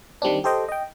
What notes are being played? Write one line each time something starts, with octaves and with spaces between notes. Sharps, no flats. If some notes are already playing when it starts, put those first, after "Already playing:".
D#3 G3 C4 D4
G4 A4 C5 D#5 G5
D#5 G5